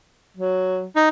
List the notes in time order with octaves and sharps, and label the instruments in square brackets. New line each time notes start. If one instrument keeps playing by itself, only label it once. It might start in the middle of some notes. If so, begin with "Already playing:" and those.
[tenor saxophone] F#3
[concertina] D#4